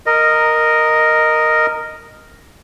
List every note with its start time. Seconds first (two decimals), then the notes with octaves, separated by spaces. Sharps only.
0.06 A#4 D#5